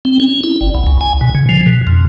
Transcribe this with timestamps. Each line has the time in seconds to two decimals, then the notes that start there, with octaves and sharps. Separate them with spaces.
0.05 C4
0.20 C#4
0.43 E4
0.61 G1
0.75 B1
0.87 C#2
1.01 G#5
1.21 B2
1.35 C#3
1.49 F3
1.66 B2
1.87 F2